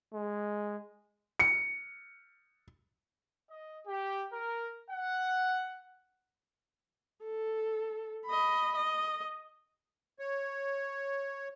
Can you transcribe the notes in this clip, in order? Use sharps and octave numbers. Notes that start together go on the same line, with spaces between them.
G#3
C#7
D#5
G4
A#4
F#5
A4
D#5 B5
D#5
C#5